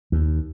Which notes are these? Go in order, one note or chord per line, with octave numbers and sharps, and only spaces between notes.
D#2